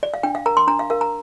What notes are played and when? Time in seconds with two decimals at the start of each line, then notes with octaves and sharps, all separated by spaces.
0.03 D5
0.14 F5
0.23 D4 G5
0.35 F5
0.46 A#4 A#5
0.57 C6
0.67 D4 A#5
0.79 F5
0.90 A#4 F5
1.01 A#5